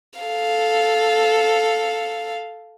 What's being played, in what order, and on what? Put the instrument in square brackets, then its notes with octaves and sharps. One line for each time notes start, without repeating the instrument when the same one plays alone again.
[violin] A4 F5